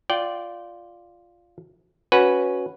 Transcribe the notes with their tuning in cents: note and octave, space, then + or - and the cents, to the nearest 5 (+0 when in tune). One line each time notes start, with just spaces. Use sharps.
F4 +0 D5 -5 G5 -20
C#4 +0 F#4 +0 B4 +0